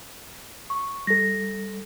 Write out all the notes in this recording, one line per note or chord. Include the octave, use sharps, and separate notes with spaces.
C#6
G3 A4 A#6